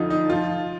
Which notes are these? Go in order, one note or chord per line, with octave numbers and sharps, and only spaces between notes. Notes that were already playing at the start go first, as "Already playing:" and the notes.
Already playing: F2 D3 F3 D#4 F4
D#4
F3 F4